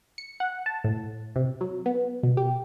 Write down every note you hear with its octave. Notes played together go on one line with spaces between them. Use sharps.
C#7
F#5
A5
A2
C3
F#3
B3
B2
G4